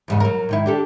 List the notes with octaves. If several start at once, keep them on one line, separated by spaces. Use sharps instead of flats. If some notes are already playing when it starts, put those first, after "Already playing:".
E2 G#2 C#3
F#3 A#4
G#2 D#3 E4
D4 G4 A4